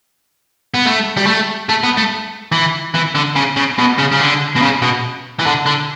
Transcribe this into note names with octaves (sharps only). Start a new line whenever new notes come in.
B3
A3
G3
A3
A3
B3
A3
E3
E3
D3
C#3
C#3
B2
C#3
C#3
D3
B2
C#3
B2
E3
D3
D3